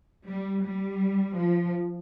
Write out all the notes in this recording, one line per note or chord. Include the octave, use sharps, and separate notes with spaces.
G3
G3
F3